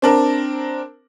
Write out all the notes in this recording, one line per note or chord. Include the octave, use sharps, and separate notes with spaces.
C4 D4 A#4